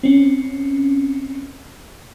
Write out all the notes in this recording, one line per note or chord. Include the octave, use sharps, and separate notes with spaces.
C4 C#4